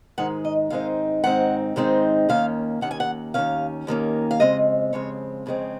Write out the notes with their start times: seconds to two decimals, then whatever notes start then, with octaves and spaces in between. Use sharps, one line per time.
0.18 G#2 D#3 G#3 D#4 F#5
0.45 D#5
0.70 G#2 D#3 G#3 C4 D#4 F5
1.24 G#2 D#3 G#3 C4 D#4 F#5
1.76 G#2 D#3 G#3 C4 D#4
2.29 D#2 D#3 A#3 C#4 F5
2.81 D#2 D#3 A#3 C#4 F#5
2.91 G#5
3.00 F#5
3.34 D#2 D#3 A#3 C#4 F5
3.87 D#2 D#3 A#3 C#4
4.31 F5
4.40 F2 C#3 G#3 C4 D#5
4.93 F2 C#3 G#3 C4 C#5
5.46 F2 C#3 G#3 C4